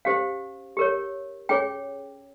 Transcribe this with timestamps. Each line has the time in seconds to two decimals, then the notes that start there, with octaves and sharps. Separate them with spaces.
0.05 C#4 G4 C5 F5
0.77 G4 A#4 C#5
1.49 C#4 G#4 C#5 G5